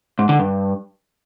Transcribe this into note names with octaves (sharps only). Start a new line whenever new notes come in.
G#2
D3
G2